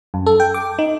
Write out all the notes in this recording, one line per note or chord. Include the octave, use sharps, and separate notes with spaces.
F#2
A4
G5
D6
D#4